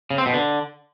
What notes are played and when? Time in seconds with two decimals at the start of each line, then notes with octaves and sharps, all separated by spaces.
0.11 C#3
0.18 C4
0.26 B2
0.34 D3